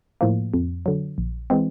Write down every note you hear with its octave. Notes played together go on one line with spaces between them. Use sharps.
A2 F3 A#3
F2
D3 F#3
A#1
E3 G#3 C4